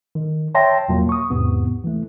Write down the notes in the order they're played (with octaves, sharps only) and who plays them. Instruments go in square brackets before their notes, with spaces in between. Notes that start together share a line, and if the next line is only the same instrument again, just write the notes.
[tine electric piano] D#3
C#5 E5 G5 A5 C6 A#6
E2 A#2 F#3 A#3
C#6 D#6
E2 G#2 C3 B3
E3 A3